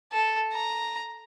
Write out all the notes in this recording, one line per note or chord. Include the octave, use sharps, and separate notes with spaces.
A4
A#5